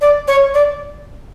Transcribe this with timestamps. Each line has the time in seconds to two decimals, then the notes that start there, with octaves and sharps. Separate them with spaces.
0.01 D5
0.28 C#5
0.54 D5